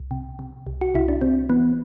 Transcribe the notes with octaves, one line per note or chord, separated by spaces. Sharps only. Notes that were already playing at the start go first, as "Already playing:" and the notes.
Already playing: C2
C3
C3
C2
F#4
C2 E4
D4
C2 C4
E3 B3